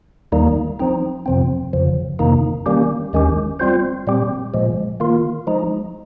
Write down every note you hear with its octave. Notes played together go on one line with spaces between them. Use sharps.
D#2 D#3 G3 A#3 D#4
F3 C4 D#4
F2 C3 F3 C4
F2 C#3 F3
F2 C3 D#3 A#3 D#4
D#3 G3 A#3 C#4 G4
D#2 D#3 G#3 C#4 G4
G3 C4 F4 C5
A#2 G3 C4 G4
A#2 F3 G#3
D#3 A#3 F4
F3 G#3 D#4